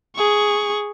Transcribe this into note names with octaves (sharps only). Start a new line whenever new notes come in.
G#4 C#6